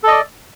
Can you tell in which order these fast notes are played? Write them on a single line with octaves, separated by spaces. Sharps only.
A4 D#5 D5